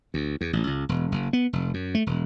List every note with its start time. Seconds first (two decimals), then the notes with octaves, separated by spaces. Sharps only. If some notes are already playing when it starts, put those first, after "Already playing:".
0.14 D2
0.41 E2
0.53 A1
0.67 C#2
0.89 E1
1.12 F#1
1.33 B3
1.53 F1
1.74 F#2
1.95 A3
2.07 E1